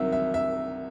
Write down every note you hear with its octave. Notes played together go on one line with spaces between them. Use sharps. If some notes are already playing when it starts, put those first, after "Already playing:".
Already playing: C2 C3 D#3 F#3 E5
E5
E5